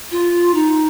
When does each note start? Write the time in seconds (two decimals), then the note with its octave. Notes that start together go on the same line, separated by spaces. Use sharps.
0.11 F4
0.54 D#4